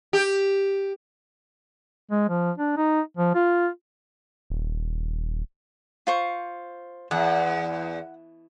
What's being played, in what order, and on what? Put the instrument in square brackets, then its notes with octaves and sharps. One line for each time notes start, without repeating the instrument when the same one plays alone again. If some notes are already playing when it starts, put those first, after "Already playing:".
[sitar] G4
[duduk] G#3
F3
D4
D#4
F3
F4
[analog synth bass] D#1
[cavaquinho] F4 C5 C#6
[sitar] E2 [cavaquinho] F#5